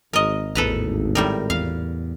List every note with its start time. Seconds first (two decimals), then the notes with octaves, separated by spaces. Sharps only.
0.13 G#1 A#4 D#5
0.55 A1 E2 A4 B4 A#5
1.15 A2 G3 A#4
1.50 E2 F5